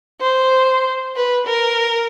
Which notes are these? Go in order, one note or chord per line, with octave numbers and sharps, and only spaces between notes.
C5
B4
A#4